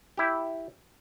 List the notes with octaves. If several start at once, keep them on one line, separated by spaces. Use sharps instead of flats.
E4 G4